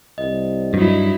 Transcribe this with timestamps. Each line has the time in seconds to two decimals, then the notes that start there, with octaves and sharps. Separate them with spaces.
0.18 C2 D#5
0.74 G2 F#3 D#4 E4